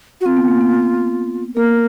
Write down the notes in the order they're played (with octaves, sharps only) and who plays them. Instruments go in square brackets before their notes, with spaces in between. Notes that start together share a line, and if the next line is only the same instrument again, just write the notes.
[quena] F#4
[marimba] C4 [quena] F4
[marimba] B3
A#3
B3
[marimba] A#3 [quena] A#4